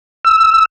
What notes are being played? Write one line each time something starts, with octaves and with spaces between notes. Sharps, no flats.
E6